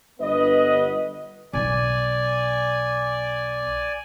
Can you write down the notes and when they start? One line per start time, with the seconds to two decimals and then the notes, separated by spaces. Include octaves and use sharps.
0.20 G1 B3 B4 D#5
1.53 B1 D5 G#5